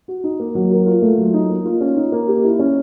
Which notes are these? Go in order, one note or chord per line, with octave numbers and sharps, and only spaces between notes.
F#4
D#4
A#3
F#3
A#4
F4
A3
F#3
D#4
A#3
F4
C#4
D#4
A#3
G4
E4
C#4